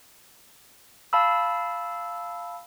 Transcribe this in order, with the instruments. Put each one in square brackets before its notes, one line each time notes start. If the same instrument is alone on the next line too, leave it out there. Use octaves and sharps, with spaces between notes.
[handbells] F5 A5 B5 E6